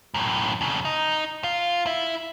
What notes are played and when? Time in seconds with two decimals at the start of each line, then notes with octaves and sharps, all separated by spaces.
0.14 F#2 A2
0.61 F2 C#3
0.85 D#4
1.44 F4
1.87 E4